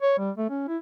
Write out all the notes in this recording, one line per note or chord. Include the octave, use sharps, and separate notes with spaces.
C#5
G3
A3
C#4
E4